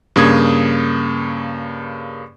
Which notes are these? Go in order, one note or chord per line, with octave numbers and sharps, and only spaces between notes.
G2 C#3 A#3 D#6 G#6